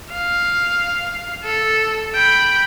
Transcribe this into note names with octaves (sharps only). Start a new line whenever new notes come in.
F5
A4
G5 B5